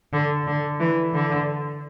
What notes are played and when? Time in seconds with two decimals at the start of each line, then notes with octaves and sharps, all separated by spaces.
0.13 D3
0.47 D3
0.80 E3
1.14 D3